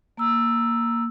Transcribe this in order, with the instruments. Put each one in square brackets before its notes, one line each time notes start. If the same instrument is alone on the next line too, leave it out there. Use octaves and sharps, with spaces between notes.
[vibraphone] A#3 A#5 E6